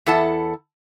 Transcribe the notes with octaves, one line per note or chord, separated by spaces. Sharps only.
E2 E4 A4 F#5 A5